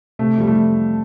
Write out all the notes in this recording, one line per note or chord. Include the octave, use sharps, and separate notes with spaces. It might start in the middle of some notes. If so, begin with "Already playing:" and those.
C3 A3
F2 G3
A3